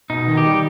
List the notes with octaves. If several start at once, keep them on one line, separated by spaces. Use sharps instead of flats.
B2 D#4
D#3
G4
G3